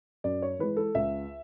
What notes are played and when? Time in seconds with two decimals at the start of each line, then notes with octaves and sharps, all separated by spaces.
0.24 F#2 D5
0.42 C#5
0.59 E3 G#3 B4
0.77 A4
0.95 C#2 E5